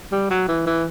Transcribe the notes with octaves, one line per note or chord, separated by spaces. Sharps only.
G3
F#3
E3
E3